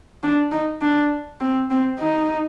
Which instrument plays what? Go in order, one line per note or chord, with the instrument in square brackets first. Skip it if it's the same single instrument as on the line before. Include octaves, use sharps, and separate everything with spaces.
[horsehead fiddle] D4
D#4
D4
C4
C4
D#4